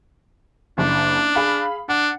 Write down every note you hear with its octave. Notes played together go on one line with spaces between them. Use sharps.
F#1 D4
G#4 F5 B5
D4 F#5